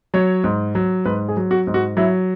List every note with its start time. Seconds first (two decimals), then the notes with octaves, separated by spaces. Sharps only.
0.14 F#3 C#5
0.44 G#2
0.75 F#3
1.05 G#2 B4
1.29 G#4
1.37 F#3
1.51 F#4
1.67 G#2
1.74 F#4
1.97 F#3 E4